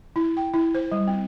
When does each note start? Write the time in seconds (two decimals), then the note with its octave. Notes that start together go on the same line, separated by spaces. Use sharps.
0.16 E4
0.37 G5
0.54 E4
0.75 C5
0.92 G3
1.08 C4